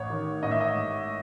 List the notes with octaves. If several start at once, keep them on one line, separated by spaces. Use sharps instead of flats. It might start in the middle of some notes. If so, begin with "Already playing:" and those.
Already playing: A1 C#5
D#3
A1 D#5
E5
D#5
G#2